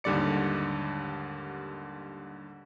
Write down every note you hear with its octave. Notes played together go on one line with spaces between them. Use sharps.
D#2 G#2 D3 G3 D5 C#7